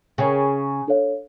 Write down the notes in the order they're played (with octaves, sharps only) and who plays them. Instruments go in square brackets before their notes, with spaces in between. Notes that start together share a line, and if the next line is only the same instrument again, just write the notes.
[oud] C#3 [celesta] A#4 C#5 G5
[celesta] D4 A4 C#5 F5